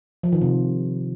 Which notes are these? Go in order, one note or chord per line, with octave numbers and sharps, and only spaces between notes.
F3
D#3
C3